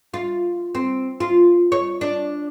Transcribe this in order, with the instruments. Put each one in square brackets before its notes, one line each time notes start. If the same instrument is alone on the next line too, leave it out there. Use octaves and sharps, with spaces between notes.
[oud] F4
C4
F4
C#5
D4